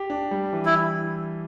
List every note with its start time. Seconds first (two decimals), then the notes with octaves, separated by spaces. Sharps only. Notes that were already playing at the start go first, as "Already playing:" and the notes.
Already playing: G4
0.10 D4
0.31 G3
0.53 E3
0.65 E4